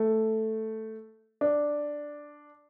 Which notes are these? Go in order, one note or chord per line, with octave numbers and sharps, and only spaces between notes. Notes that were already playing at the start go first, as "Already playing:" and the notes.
Already playing: A3
D4